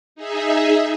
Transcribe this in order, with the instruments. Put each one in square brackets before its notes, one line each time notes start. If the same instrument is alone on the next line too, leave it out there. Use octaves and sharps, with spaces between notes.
[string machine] D#4 G#4 E5